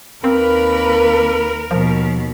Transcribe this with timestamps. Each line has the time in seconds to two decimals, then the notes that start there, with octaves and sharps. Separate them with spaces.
0.24 D#2 A#3 C4 A#4 B4 B5
1.71 D#2 B2 F3